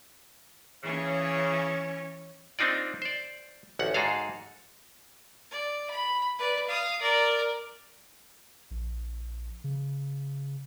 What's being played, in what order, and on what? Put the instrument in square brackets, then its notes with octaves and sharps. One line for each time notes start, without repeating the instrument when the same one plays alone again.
[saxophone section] C#3 [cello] E3 C#4
[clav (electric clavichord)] C4 D4 D#4 F4 D5
C5 D5
A1 D2 F#5
G#2 F#4 G#4 A4 F5
[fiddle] D5
B5
B4 D5
F5 D#6
A#4 D5
[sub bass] A#1
C#3